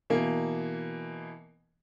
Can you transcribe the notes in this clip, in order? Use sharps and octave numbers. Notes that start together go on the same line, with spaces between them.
B2 E3 A#3